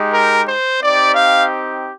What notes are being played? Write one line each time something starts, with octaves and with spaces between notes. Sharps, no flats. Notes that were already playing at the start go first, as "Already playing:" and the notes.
Already playing: G#3 D#4 G4
A#4
C5
C4 D#4 G4 D5
F5